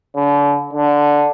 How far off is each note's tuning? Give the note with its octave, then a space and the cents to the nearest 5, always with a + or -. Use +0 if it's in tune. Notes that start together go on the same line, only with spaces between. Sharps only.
D3 -35
D3 -5